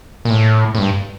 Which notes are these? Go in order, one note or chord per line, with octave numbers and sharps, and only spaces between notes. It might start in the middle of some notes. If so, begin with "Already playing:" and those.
A#2
A2
A2
G2